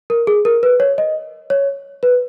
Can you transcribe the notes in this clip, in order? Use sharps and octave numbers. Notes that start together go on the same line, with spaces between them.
A#4
G#4
A#4
B4
C#5
D#5
C#5
B4